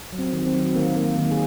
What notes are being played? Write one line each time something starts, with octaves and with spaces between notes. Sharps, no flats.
F#3
C4
D#3
C4
F#3
D#3 A#3
A#3
D#3
G#4